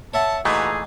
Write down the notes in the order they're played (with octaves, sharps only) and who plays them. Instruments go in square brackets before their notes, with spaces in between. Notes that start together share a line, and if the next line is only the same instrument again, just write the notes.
[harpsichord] C#5 E5 F#5 [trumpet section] A5
[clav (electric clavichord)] A#2 E3 A3 [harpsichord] D#4 [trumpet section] F#4 B4 A#5 [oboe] G#4